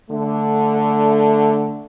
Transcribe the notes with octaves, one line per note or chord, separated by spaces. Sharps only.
D3 A3